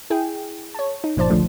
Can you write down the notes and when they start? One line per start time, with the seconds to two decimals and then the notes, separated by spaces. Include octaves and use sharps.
0.10 E4 G#4 G5
0.74 C#5 A5
1.04 D#4
1.16 G1 A#2 F3 C5 D5 A5
1.30 C#2 D3 F3 A3